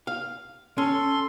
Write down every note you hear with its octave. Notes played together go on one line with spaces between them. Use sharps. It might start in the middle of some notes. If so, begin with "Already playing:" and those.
F5
C#4 A4 C6